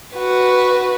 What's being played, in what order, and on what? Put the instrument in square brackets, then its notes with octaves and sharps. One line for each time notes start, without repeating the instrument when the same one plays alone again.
[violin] F#4 B4